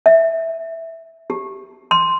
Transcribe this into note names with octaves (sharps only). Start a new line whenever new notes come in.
E5
G4
C6